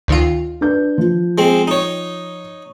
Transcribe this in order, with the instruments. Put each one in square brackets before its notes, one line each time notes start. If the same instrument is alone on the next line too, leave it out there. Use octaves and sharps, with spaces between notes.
[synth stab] D2 D#3 F4
[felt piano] D4 B4 G6
F3
[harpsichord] G#3 C4
D#4 C#5